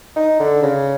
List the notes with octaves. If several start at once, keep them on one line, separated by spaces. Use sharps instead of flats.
D#4
D3
C#3